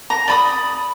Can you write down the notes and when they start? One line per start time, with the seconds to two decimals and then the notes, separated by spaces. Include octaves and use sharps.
0.10 A#5
0.28 D5 B5 D#6